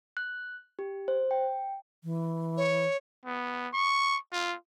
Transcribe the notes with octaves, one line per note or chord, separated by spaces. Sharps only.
F#6
G4
C5
G5
E3
C#5
B3
C#6
F4